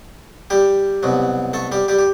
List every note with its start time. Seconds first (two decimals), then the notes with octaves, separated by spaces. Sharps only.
0.50 G3 G4
1.03 C2 B2 F#3
1.53 A3 A4
1.72 G3 G4
1.88 G3 G4
1.99 G4